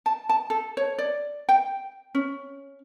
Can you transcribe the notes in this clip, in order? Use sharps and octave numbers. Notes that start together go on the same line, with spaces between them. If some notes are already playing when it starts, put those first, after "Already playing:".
A5
A5
A4
C#5
D5
G5
C#4